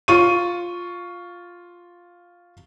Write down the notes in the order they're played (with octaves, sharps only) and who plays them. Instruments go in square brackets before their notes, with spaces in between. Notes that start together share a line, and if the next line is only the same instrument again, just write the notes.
[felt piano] F4 C#6 D#7